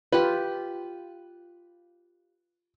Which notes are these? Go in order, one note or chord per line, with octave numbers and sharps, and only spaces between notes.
F4 G4 B4